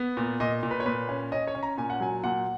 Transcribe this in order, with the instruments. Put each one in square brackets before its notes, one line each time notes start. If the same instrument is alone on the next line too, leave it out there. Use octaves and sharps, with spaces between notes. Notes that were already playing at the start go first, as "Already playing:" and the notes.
Already playing: [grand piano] B3
A#2
A#2 D#5
A#2
B4
C#5
A#2 B4
C#4
C#4 D#5
C#5
C#4
A#5
A#2 G#5
F#5
F#3 G#5
A#2 F#5